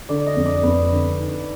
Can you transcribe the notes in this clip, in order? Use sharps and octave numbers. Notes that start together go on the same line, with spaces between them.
D3 D5
D#5
F2
D5
F2 B4
D3
D#4